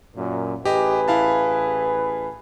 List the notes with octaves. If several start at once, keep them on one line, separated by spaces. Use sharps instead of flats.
F#2 A#2
A1 G4 G#4 B4 D#5
E4 F5 A5